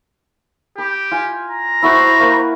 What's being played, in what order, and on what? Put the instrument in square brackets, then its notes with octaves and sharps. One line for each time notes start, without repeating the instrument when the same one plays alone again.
[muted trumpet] G4 [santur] B5
[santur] F4 G#5
[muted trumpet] A#5
[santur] E4 F#4 B4 [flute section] C5 B5 C#6
[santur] A#3 B4